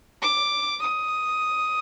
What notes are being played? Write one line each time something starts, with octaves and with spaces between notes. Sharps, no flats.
D6
D#6